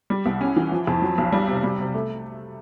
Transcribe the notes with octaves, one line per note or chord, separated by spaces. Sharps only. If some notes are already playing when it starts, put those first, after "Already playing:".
G3
C2
C#4
E3
F3
F2
F#3
B1
G3
C3
G3
C3
A3